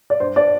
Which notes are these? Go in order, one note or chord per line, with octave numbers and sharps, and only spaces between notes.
D5
G2 C5
D4 D5